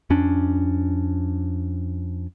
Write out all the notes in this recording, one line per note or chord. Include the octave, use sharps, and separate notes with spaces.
F2 C#4 D4